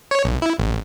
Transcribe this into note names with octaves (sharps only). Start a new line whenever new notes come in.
C#5
B1
E4
A1